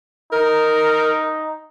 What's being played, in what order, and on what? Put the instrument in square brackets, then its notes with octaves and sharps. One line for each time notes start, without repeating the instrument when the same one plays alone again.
[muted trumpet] D#4 [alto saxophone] A#4